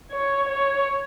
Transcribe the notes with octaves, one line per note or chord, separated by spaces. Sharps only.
C#5
C#5